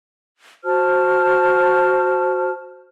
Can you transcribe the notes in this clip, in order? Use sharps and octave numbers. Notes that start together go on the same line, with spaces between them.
F#4 C5 A5 F6